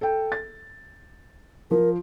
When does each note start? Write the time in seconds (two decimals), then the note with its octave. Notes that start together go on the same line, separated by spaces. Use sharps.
0.01 A4 G5
0.32 A6
1.71 F3 A#4